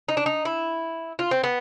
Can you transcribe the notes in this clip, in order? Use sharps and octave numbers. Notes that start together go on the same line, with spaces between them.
D#4
D4
D#4
E4
F4
C4
B3